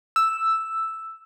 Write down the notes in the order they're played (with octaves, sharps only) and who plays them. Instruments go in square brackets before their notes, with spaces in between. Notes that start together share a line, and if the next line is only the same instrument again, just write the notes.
[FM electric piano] E6